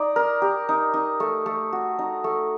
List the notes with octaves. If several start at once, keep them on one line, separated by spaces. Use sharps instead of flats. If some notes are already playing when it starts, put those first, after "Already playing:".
Already playing: D#4 D5
A#4
G4
D#4
D#4
A3
A3
F#4
D#4
A3